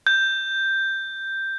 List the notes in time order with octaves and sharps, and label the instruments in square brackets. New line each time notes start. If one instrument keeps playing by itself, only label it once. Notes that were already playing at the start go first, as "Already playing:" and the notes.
[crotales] G6